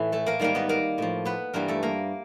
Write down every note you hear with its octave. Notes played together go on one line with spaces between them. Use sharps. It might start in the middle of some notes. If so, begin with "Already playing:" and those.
Already playing: A2 E3 E4
A3 A4
A#3 A#4
G#2 D#3 G3 A#3 A#4
B3 B4
A#3 A#4
A2 F3
B3 B4
G2 E3 G3 A#3 A#4
A3 A4
A#3 A#4